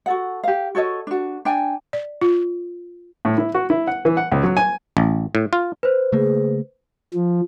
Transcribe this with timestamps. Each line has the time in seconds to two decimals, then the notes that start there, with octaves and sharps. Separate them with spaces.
0.06 F#4 A4 F#5
0.44 G4 F5
0.75 F#4 A4 C#5 D#5
1.07 D4 F#4
1.45 D4 G5 G#5
1.93 D5
2.21 F4
3.25 A2
3.38 E4
3.55 F#4
3.70 E4
3.87 F#5
4.05 E3
4.17 F#5
4.32 C#2
4.43 F#3
4.57 G#5
4.97 A1
5.35 A2
5.53 F4
5.83 B4 C5
6.12 C#3 A3 A#3 G#4
7.14 F3